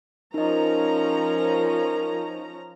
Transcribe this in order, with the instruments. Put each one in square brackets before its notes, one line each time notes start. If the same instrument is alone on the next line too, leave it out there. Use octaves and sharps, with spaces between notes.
[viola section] F3 C#4 A#5 [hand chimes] D#4 D#5 [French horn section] A#4